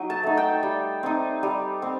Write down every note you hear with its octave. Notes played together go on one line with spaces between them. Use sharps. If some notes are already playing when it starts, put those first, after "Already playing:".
Already playing: F#3 D#4
A5
A3 D#4
G5
G3
C4 D#4
G3
C4